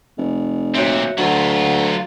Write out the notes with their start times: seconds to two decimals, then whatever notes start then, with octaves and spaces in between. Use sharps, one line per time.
0.18 F1
0.75 A#2 C4 F#4 C#5 E5
1.18 D2 F#3 F4 F#5